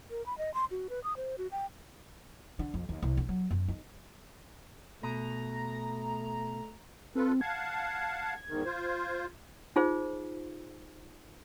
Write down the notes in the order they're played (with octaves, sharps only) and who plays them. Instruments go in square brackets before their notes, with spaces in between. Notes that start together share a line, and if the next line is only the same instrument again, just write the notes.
[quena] A#4
B5
D#5
C6
F#4
B4
D#6
C5
F#4
G5
[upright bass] D3
F2
D#2
C2
D3
F#3
F#2
D#4
[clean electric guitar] B2 [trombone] A3 [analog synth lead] A#5
[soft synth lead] C4 [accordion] F4 A4 B4
[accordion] F5 F#5 A5 [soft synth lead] G#6
[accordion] E2 G#2 D#3
F4 C5
[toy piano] D#4 F4 G#4 C5